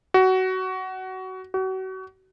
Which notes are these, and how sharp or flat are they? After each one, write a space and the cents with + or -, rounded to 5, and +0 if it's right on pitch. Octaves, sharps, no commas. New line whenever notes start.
F#4 +20
F#4 +35